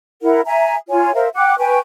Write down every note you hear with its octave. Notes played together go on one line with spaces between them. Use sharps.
E4 A#4 F#5
E5 G#5 A#5
F4 C#5 G#5
A#4 C5 E5 F5
F#5 G5 D6 F#6
B4 G5 G#5 C#6